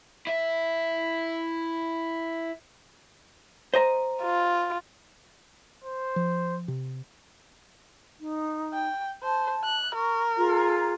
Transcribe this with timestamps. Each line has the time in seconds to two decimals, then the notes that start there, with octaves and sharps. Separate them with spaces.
0.27 E4 E5
3.74 C5 D#5 A#5
4.22 F4
5.84 C5
6.16 F3
6.68 C3
8.20 D#4
8.73 G5
9.23 C5 A5
9.64 F#6
9.95 A#4 C#6
10.38 F4 G#4 A#5